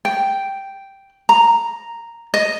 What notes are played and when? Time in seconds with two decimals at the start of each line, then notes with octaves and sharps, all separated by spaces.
0.05 G5
1.29 A#5
2.34 D#5